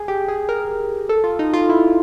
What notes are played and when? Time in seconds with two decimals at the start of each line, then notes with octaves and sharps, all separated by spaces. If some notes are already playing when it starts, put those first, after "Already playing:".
Already playing: G#4
0.08 G4
0.28 G#4
0.49 A#4
1.09 A4
1.24 F4
1.39 D#4
1.53 F4
1.69 E4